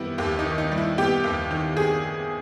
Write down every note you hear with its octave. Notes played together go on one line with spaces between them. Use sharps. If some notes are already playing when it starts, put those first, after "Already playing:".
Already playing: D#3 G3 B3 E4 G4
D#2 G4
D#4
D#3
D#4
G3
E4
B3 G4
D#2
D#3
G#4